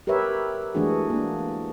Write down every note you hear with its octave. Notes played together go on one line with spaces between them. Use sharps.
G4 A#4 B4 C#5 E5
E3 G#3 A3 D4 F#4 G#4
A#3 D4